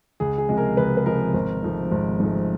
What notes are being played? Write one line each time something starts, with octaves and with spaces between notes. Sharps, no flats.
C#2 G#4
G#4
C3 F3 G#3
A#4
C#2 B4
B4
C3 F3 G#3 A#4
G#1
G#2 F3 A3
G#1
G#2 F3 A3